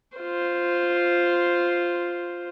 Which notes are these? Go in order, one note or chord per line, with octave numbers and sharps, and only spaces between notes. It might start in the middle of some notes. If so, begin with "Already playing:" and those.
F4 C5